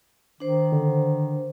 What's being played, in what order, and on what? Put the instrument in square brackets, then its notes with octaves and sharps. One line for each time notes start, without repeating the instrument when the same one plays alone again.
[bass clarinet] D#3 [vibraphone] D4 C5
[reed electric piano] D3